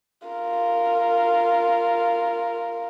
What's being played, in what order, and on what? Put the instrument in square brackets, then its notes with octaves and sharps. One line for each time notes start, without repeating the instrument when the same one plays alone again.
[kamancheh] F4 A#4